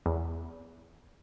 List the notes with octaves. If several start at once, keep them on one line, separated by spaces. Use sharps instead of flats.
E2